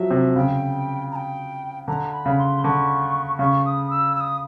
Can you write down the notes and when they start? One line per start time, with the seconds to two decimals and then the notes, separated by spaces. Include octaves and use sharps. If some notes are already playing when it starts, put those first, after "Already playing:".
Already playing: F3 F#3 E5
0.11 C3
0.36 C#3 G5
1.11 A#5
1.16 G5
1.87 D3 A#5
2.13 B5
2.26 C#3
2.39 C6
2.64 D3 C#6
3.39 C#3 C#6
3.65 D#6
3.90 E6
4.16 E6
4.20 D#6